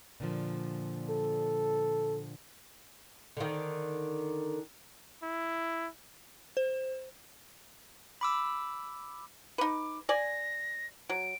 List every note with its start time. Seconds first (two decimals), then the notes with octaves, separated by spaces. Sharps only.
0.20 A#2 D3 F3
1.09 A4
3.37 D3 D#3
5.23 E4
6.57 C5
8.21 B5 D6 E6
9.58 D#4 B4 D6
10.09 D5 G#5 A#6
11.10 F#3 D7